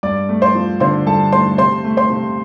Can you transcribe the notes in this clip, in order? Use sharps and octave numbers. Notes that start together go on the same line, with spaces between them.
G2 D5 D6
A3
C5 C6
F3
D3 C5 C6
G2 A4 A5
A3 C5 C6
C3 C5 C6
A3
C5 C6
C3